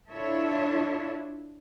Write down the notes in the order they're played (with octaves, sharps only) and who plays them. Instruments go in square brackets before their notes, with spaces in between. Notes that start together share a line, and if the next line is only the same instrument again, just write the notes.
[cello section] D4 E4 F4 A4 C#5 E5